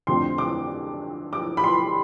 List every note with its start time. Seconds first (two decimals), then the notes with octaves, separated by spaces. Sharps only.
0.07 F2 D3 A3 C4 C6
0.38 D6
1.33 D6
1.57 B5
1.64 C6